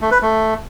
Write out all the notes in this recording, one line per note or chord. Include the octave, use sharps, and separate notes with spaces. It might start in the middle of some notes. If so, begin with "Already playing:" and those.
A3
B4
A3